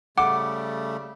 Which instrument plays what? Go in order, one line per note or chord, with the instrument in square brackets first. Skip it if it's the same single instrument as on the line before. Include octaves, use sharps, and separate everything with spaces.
[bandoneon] C#3 G3 A3 [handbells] F#5 [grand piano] D6